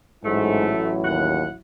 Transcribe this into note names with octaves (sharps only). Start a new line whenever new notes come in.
A1 G#2 F#3 A3 E4
D#2 F#5